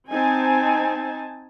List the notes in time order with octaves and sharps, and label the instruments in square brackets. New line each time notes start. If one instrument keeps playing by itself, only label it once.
[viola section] C4 D#4 G#5 A5